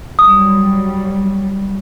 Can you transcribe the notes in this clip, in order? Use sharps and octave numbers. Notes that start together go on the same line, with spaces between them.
F#3 G3 D#6